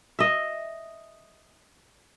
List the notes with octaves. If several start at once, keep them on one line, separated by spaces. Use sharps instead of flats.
D#5 E5